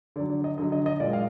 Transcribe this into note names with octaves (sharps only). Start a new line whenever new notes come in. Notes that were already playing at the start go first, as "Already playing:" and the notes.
D3 F#3 D5
D5
D#5
D3 F#3 D#5
D#5
D#5
A#2 G#3 D5
F5